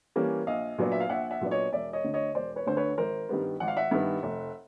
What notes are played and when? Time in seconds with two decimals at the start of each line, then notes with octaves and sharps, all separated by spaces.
0.16 E3 G3 A#3 C#4
0.47 A#1 D#5 F5
0.78 A#2 F#3 B3 D4
0.92 E5
1.00 F5
1.09 A#1 E5 F#5
1.31 E5 F#5
1.41 A#2 F#3 B3 D4
1.51 C#5 D#5
1.73 E1 D5 E5
1.93 C#5 D#5
2.04 D2 D3
2.14 C#5 D#5
2.35 E1 C5 D5
2.56 B4 C#5
2.66 D2 D3 C5
2.77 B4 C#5
2.98 G#1 A#4 C5
3.29 G2 D#3 G3 B3
3.60 G#1 F#5
3.68 F5
3.77 E5 F#5
3.91 G2 D#3 G3 B3
4.23 F1